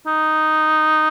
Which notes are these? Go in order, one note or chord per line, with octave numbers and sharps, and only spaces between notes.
D#4